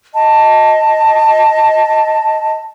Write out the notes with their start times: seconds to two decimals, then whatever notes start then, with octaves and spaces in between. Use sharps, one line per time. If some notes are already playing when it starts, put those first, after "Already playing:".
0.14 D#5 A5